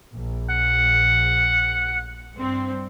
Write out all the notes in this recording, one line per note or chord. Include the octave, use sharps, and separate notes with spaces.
A#1
F#5
G2 C4